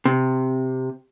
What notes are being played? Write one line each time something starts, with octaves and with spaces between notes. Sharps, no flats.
C3